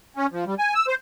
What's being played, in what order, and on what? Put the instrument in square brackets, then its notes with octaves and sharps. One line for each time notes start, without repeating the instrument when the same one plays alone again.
[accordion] C#4
F3
G3
G#5
E6
C5